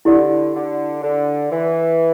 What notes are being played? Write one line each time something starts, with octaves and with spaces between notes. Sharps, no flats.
D3 E4 G4 D5
D3
D3
E3